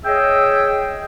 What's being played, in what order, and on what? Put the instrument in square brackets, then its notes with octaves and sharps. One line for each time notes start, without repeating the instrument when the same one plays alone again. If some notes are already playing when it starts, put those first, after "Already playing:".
[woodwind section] G#4 C#5 D#5 E5 G5